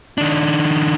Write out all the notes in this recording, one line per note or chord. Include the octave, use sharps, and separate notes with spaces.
D#3 D4